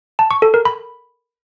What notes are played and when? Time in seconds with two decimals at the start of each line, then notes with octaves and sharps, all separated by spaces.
0.19 A5
0.31 C#6
0.42 A4
0.54 A#4
0.65 B5